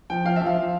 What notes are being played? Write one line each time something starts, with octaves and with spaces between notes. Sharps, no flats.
F3 G5
F3 F5
F3 E5
F5
F3